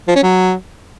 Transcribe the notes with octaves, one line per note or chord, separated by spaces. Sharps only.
F3
C#4
F#3